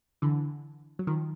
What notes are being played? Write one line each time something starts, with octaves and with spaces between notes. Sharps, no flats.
D3 E3
F#3
D#3 F3